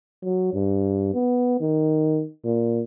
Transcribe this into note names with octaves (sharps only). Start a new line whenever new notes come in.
F#3
G2
B3
D#3
A#2